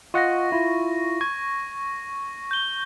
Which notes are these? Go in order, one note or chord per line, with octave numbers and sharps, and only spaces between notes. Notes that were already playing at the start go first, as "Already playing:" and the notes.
F4 D#5 F#5 C#6 A#6
E4 F4
C#6 G#6
G6 G7